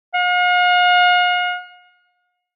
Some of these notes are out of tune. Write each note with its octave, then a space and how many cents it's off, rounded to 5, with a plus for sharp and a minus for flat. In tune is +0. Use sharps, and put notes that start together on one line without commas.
F5 +45